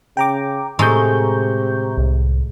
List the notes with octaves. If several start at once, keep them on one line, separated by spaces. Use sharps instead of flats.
C#3 G5 A#5 D6
A2 C3 G#3 A#5 C#6 G6
C2